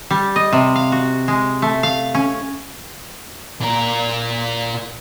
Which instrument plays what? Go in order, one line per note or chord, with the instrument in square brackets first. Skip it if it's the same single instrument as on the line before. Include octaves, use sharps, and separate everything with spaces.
[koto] G3
D#5
C3
F5
F#4
G#3
A3
F5
C#4
[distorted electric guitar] A#2 A#4